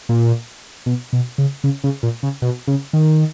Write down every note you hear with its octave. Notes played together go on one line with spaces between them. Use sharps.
A#2
B2
B2
C#3
C#3
C#3
A#2
C#3
B2
C#3
D#3